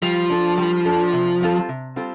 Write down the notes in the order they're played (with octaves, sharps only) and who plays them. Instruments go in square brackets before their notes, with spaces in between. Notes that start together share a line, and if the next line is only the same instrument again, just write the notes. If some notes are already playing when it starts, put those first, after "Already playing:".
[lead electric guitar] F3 [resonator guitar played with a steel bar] G3
[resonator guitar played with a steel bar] D4 A4
G3
D4 A4
C3
G3 C4 F4 A4
C3
G3 C4 F4 A4